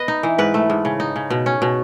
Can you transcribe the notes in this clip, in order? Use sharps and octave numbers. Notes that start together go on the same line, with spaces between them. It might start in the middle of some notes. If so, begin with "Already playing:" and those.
Already playing: B3 B4 D#5
D#4
E3
G#2 B4
A3
G#2
C#3
D#4
C#3
B2
C#4
B2